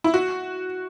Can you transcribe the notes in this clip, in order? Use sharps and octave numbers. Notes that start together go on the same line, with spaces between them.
E4
F#4